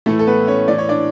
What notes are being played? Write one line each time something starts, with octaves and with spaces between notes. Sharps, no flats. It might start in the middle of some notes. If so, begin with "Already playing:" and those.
A2 E3 A3 A4
A4
B3 B4
C#4 C#5
A2 E3 D5
C#5
D4 D5